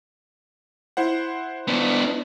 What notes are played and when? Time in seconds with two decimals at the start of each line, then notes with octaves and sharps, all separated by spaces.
0.97 E4 C5 F#5
1.68 B3 D4